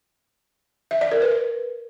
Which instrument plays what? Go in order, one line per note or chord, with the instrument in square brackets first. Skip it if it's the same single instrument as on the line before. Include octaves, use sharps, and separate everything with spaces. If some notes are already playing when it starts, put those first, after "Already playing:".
[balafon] E5
D5
A#4
B4